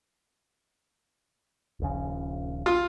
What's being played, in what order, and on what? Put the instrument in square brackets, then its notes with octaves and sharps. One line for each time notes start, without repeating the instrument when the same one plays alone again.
[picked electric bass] D#1 A#1 C#3
[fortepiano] F4